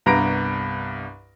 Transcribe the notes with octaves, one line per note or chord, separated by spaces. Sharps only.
C2 G2 B3 A#5 A#6 D7